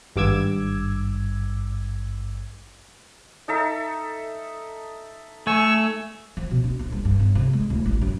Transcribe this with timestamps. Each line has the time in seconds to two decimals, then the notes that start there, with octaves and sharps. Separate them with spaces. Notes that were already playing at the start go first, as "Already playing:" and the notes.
0.16 G#1 G2 D6 E6 G#6
3.48 D#4 A4 E5
5.47 A3 G#5 C#6 E6
6.37 F3
6.51 B2
6.64 D4
6.79 A#1
6.92 G3
7.05 G2
7.20 G1
7.35 C3
7.53 G#3
7.70 D1
7.86 A1
8.01 F#2